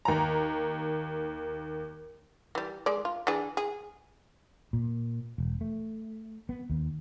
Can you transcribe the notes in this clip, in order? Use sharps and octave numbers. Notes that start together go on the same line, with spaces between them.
D#2 A#5
E3 G3
G#3 D5
F4
E3 D4 G#4
G#4
A#2
E1
A3
B3
D#2